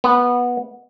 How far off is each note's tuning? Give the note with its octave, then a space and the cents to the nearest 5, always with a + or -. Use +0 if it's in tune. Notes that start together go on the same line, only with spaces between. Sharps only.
B3 -15